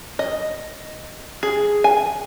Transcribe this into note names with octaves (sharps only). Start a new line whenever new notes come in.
D#5
G#4
G#5